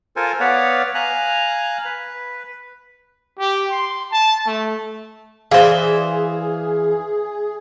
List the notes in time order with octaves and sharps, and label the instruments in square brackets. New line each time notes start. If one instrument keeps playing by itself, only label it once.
[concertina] F4 A4 A#4 C5 G#5
B3 B4 C#5 D5 F5 F#5
F5 G#5 A#5 F#6
B4
[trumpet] G4
C6
A5
A3
[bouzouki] E3 C5 [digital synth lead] G#4 [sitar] D5 E5 [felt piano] F5